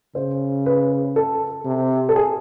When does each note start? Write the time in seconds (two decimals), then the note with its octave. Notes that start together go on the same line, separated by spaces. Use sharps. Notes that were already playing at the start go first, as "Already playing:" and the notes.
0.15 C#3 C5
0.66 B4
1.16 A4
1.65 C3
2.09 A4
2.16 G#4